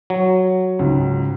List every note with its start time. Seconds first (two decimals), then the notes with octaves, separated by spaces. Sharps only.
0.10 F#3
0.79 C#2 G#2